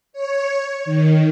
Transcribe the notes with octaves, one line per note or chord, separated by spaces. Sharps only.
C#5
D#3